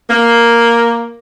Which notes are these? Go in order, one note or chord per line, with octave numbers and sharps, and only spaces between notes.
A#3